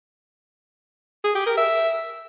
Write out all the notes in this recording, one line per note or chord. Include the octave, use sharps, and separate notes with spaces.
G#4
G4
A#4
E5